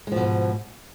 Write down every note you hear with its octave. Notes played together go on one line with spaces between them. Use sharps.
G#2 B2 F3 G#3